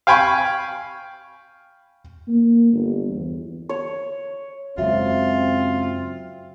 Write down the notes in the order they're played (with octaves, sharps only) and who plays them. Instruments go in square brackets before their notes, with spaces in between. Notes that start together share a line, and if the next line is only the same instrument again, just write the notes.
[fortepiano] F5 G5 G#5 B5 C#6
[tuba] A#3
G1
E2
[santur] C#5
[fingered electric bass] F#2 C#3 G#3 [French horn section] C4 [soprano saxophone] F4 [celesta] F#4 E5